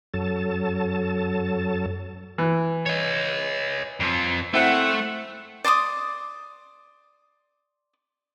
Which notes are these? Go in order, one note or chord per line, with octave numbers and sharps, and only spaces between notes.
F#2 F#3 A4 A5
E3
C#5 D#5
F2 F3
A3 C4 E4 F#5
D5 C6 D6 D#6